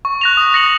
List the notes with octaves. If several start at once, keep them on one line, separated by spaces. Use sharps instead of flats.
C#6
F#6 A#6 F7
D#6
A#6 C#7 F#7